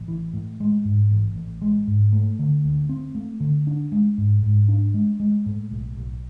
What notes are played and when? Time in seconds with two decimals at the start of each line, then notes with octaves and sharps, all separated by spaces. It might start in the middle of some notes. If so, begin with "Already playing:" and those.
Already playing: A1
0.08 E3
0.34 A2
0.60 G#3
0.85 G#2
1.11 A1
1.36 A1
1.62 G#3
1.87 G#2
2.13 A3
2.39 D3
2.64 D2
2.89 C4
3.15 A3
3.40 D3
3.67 D4
3.92 G#3
4.18 G#2
4.43 G#2
4.68 D4
4.94 G#3
5.20 G#3
5.46 A2
5.71 B1
5.97 B1